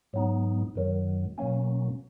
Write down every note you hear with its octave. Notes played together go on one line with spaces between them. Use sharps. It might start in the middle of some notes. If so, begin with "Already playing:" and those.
G#2 F#3 B3 D#4
F#2 D#3 F#3
B2 F#3 A#3 C#4